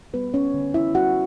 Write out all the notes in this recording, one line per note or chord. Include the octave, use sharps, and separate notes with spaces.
G3 B3 B4
C#4 C#5
D3
E4 E5
G3 F#4 F#5